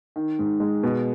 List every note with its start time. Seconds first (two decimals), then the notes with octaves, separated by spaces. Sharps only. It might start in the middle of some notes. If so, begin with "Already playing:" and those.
0.16 D#3
0.39 G#2
0.60 G#3
0.83 B2